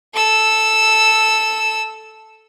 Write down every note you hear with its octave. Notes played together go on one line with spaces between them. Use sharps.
A4 E6